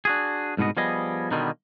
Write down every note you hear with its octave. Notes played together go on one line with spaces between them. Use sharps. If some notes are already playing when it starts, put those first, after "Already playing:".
D4 F#4 G#4
C2 G#2 B2 B3 D#5
F3 G3 B3 G#4 D#5
B2 D3 D#3 G3 A#3 B3